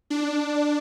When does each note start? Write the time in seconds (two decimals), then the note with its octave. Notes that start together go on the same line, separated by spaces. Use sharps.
0.10 D4